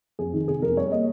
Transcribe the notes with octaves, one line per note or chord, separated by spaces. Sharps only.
F2 G#4
D#3
C3 G#4
F2 A#4
G3 C#5
A#3 D#5